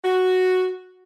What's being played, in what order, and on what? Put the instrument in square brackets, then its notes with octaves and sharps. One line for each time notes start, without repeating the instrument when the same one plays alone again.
[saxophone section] F#4